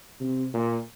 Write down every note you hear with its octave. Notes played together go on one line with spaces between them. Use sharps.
C3
A#2